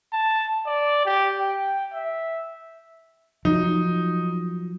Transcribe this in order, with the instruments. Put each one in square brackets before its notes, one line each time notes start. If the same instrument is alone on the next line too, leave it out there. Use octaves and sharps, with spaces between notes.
[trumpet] A5
D5
G4
G5
E5
[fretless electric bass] F3 F#3 [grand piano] D#4